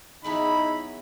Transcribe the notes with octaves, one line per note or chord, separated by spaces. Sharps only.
E2 E3 F#3 D#4 E4 B5